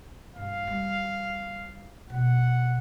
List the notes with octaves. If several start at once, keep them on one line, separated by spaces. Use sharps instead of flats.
G2 F5
G3
B2 F#5